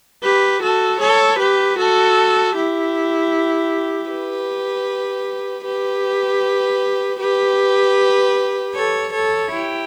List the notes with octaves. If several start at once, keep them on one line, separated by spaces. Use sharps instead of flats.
G4 B4
F#4 A4
A4 C#5
G4 B4
F#4 A4
E4 G4
G4 B4
G4 B4
G4 B4
A4 C#5
A4 C#5
E4 G4